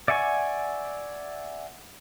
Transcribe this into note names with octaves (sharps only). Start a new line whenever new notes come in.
D5 E5 F#5 G#5 C#6